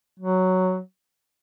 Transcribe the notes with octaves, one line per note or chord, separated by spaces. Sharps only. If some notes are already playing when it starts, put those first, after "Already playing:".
F#3